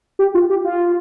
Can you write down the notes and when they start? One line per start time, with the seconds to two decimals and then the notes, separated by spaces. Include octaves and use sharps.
0.19 G4
0.34 F4
0.50 G4
0.65 F4